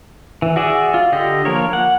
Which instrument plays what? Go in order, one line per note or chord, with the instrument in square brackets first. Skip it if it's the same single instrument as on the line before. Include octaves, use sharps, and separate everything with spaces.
[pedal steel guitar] E3
F#4 G#4 D5 E5
F4
D3 G4 D#5
F3 A#3 A#4 C#5
F#5